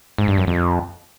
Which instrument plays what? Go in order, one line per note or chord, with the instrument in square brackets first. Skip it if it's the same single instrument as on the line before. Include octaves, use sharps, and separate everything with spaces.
[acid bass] G#2
G2
F#2
F2